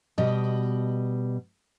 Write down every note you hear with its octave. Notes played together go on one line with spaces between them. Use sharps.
B2 G3 D#5